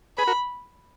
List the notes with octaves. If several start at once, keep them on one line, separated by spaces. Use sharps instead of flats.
G#4 B4 B5
F#4 A#4